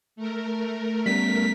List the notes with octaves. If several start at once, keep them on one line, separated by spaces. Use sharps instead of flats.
A3 A#4
G3 B3 C#4 B6